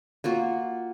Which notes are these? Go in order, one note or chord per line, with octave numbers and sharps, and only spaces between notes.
A#3 F4 F#4